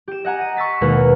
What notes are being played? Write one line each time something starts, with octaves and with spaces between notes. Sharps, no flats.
G4 E7
D#5 F#5 G#5 A#5
D#7
C#6 E6 A6 B6
D#2 B2 G#3 D#4 A#4 B4